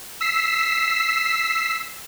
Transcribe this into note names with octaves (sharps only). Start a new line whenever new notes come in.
E6 B6 C7